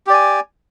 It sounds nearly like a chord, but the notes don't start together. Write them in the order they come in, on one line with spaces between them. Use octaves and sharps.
G4 D5 G#5